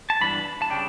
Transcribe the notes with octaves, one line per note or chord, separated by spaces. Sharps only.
A5
G2 E3 B3 D4 B5
A5
C#3 G3 D4 G5